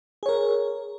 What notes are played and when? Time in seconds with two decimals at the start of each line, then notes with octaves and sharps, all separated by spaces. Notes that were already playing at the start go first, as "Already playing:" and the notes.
0.23 G#4
0.26 C#5
0.29 A#4